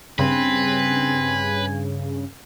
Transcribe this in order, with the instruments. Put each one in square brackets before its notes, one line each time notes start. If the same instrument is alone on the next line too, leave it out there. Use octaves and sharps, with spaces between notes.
[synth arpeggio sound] G2 C#3 [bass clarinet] C4 [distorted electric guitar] B4 [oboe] G#5